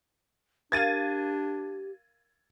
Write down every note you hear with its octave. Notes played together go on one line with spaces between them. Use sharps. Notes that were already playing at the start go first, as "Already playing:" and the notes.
D4 G4 A#4 F5 G#6 A6 D#7